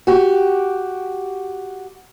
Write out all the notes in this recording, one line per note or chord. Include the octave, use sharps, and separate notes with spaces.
F#4 G4